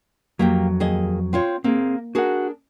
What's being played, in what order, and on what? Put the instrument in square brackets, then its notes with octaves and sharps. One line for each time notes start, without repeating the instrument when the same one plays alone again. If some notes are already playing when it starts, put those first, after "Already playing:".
[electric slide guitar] F2 F#3 [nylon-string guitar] A#3 G4 G5
[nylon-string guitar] D#2 G#4 D#5
C4 F4 C#5
[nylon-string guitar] A#3 [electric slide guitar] C4 G#4
[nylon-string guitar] D4 G#4 A#4 [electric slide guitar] F#4 F#5